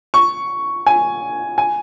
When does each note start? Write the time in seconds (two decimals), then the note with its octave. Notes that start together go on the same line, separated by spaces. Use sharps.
0.14 C#6
0.86 G#5
1.58 G#5